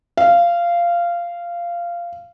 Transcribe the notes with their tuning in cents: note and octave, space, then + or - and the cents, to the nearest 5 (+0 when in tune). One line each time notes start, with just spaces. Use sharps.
F5 -15